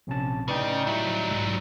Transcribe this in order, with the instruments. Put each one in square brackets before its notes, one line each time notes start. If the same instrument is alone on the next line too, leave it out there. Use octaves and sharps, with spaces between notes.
[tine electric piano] A#1 C#4 A5 [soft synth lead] C3
[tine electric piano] A2 D5 G5 [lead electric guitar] C#3 [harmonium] D#4 [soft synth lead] B4
[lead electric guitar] F#3 G3 [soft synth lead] E4
[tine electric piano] B1 [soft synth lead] G#2